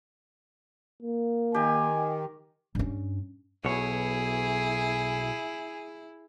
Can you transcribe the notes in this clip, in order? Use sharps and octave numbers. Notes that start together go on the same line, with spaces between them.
A#3
D#3 D#4 G4 G#5
G2 C#4
B1 B2 E4 G#4 C#5